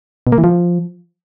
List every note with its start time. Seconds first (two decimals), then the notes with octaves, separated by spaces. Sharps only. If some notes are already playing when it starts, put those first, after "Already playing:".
0.27 B2
0.32 A#3
0.38 E3
0.44 F3